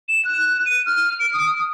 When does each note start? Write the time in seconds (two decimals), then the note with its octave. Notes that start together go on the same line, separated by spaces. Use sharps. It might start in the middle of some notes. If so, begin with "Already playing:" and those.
0.09 E7
0.25 F#6
0.66 D#7
0.86 F6
1.20 D7
1.33 D#6